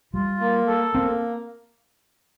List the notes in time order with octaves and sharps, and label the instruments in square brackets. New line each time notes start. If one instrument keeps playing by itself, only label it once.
[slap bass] G3 [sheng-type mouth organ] F4
[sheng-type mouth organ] A#3
A4
[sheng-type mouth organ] A#3 [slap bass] C4